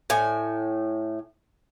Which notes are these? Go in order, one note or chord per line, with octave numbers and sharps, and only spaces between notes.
A2 G#5